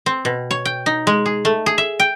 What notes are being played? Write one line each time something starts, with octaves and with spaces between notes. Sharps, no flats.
C4
B2
C#5
G5
D#4
G#3
G#4
A3
G#4
E5
G5